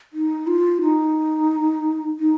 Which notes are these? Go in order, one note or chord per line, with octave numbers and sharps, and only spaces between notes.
D#4
F4
D#4
D#4